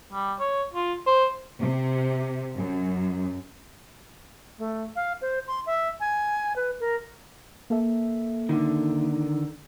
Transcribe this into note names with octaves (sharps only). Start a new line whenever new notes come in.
G3
C#5
F4
C5
C3
F#2
A3
F5
C5
C6
E5
G#5
B4
A#4
A#3 A4 E5
D3 D#3